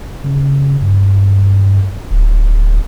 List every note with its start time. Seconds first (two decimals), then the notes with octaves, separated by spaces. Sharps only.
0.24 C#3
0.82 G2
2.11 D1